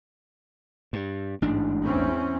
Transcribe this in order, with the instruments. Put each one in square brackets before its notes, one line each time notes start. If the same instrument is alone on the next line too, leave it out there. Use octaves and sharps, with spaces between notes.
[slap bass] G2
[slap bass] A1 D4 [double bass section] G#2
[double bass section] E2 C4 C#4